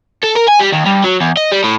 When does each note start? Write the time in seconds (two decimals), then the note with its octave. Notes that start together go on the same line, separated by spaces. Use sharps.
0.23 A4
0.35 A#4
0.48 G#5
0.59 G3
0.72 D#2
0.86 G2
1.04 F#3
1.21 E2
1.37 D#5
1.52 G3
1.64 A2